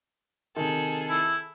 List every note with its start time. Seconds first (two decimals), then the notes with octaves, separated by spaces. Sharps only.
0.56 C3 D#3 G#4 A4
1.10 E4